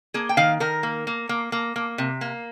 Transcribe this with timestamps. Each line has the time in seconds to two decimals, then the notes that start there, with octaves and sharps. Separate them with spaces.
0.14 A#3 G#4
0.29 G5
0.37 D#3 F5
0.60 D#3 A#4
0.83 A#3
1.07 A#3
1.29 A#3
1.52 A#3
1.76 A#3
1.98 C3
2.21 A#3